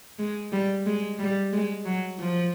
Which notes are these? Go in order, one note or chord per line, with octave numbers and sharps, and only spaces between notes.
G#3
G3
G#3
G3
G#3
F#3
F3